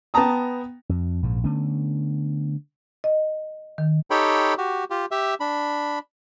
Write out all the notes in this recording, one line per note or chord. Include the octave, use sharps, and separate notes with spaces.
B3 G5 A5 A#5 D#6
F2
A#1 G#2
D3 A3 B3 C#4
D#5
D#3
D#4 G4 A4 C#5 G5 B5
F#4 G4
F4 G4
G4 E5
D4 B5